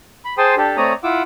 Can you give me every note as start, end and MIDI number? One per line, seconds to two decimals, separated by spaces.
0.25 0.34 83
0.38 0.55 68
0.38 0.55 72
0.38 0.55 79
0.38 0.55 81
0.38 0.55 84
0.38 0.55 87
0.57 0.77 62
0.57 0.77 67
0.57 0.77 69
0.77 0.93 57
0.77 0.93 60
0.77 0.93 73
0.77 0.93 74
0.77 0.93 82
0.77 0.93 87
1.03 1.22 64
1.03 1.22 65
1.03 1.22 78
1.03 1.22 86
1.03 1.22 88